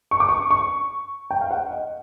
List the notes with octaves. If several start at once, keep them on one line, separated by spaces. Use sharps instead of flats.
C#6
D6
C#6
C#6
G5
F5
F#5
D#5